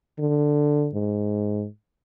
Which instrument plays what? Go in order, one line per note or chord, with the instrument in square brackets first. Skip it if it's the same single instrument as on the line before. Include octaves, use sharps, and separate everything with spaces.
[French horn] D3
G#2